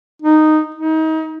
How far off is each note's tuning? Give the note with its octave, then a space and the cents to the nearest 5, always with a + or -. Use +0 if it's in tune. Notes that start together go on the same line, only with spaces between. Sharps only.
D#4 -10
D#4 +30